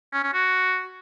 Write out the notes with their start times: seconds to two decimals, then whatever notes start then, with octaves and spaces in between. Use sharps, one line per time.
0.13 C#4
0.23 C#4
0.33 F#4